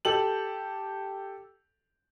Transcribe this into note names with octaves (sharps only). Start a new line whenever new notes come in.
G4 A4 F#7